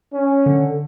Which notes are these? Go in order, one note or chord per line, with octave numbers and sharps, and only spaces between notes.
C#4
D3